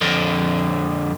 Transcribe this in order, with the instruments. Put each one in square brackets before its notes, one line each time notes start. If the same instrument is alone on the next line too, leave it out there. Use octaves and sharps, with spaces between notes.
[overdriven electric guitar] F2 D3